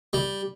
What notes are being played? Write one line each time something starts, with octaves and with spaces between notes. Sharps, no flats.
G3